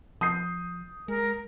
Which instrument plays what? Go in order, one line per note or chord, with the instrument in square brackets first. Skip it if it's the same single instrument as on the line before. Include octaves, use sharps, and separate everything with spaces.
[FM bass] F3 [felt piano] D#6 G6 C7
[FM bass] G#3 [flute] A#4